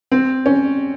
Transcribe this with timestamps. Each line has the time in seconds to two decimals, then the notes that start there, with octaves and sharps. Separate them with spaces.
0.12 C4
0.46 C#4